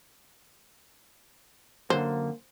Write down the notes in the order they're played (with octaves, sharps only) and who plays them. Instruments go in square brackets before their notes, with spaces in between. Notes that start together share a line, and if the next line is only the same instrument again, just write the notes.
[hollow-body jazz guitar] F#2 D3 [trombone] A#3 [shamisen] C5